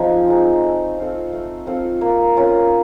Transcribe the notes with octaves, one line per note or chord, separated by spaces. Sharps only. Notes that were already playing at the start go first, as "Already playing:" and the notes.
Already playing: F3 G#3 C4 D#4
G#3 C4 D#4
A3
C4 F4 A4
A3
C4 F4 A4
A#3
C#4 F4 A#4